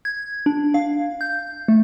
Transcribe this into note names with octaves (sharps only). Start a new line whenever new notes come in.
G#6
D4
F5
G6
A3